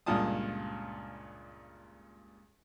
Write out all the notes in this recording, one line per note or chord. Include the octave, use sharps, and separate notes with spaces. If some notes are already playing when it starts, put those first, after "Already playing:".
C#2 G2 A#2 F4 A5 D#6